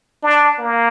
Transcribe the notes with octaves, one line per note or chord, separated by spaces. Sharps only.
D4
A#3